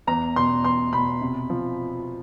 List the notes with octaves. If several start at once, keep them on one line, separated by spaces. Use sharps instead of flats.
E2 A#5
B2 C6
E2 C6
B2 B5
C3
F3